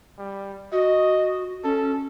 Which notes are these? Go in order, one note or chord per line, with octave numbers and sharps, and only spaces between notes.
G3
F#4 D#5
C#4 A4